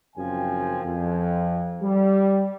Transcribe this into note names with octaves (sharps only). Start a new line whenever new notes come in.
F#1 F#2 F3 C4 G5 G#5
F2
G3